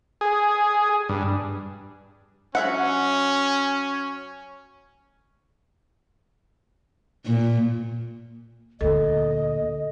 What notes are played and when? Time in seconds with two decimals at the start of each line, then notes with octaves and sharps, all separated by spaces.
0.21 G#4
1.09 G2
2.55 F#3 C#4 E5 F#5
7.26 A#2
8.81 D2 A#2 A4 D#5